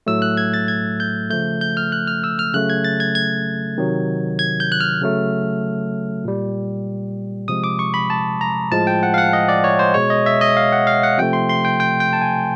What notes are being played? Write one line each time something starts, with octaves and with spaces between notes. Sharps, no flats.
A2 F#3 A3 E6
F#6
G#6
A6
G#6
G6
C#3 F3 A3 G6
G6
F6
F#6
F6
E6
F6
C#3 F#3 A3 F#6
G#6
A6
G#6
G#6
C3 D#3 F#3
G#6
G6
F#6
F6
C#3 F#3 A3
A#2 G3
C3 F3 G#3 D#6
D6
C#6
B5
A5
A#5
A2 F3 G#3 A5
G5
F#5
F5
F#5
D#5
D5
C#5
C5
B2 G#3 C#5
D#5
E5
D#5
F5
F#5
F5
F#5
C3 F3 A3 G5
C6
C6
G5
G5
G5
A5
G#5